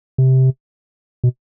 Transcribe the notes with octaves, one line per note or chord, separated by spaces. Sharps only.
C3
B2